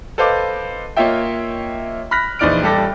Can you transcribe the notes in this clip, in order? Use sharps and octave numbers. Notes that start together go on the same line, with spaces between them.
A4 B4 C5 D#5 F5 D6
A#3 F4 C#5 D#5 E5 G5
B5 F6 F#6 A#6 B6
A#1 E3 D#4 D5 F6 D7
D#1 G3 G4 A4 D6 A#6